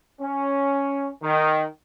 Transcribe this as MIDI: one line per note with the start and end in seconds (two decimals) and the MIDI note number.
0.21 1.08 61
1.22 1.63 51